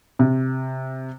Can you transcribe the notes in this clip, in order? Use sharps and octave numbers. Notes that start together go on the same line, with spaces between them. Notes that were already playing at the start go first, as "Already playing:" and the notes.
C3